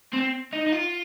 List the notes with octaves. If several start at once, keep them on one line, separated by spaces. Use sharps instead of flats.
C4
D#4
D#4
F4